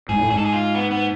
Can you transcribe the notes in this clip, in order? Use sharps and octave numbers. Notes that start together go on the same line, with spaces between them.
G#2 G#4
A2
G#2 G#4
A4
G#4
F4
B3
B3